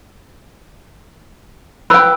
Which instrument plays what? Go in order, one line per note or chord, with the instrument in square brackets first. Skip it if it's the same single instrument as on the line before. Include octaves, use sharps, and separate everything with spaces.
[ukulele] B4 G5 [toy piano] B5 E6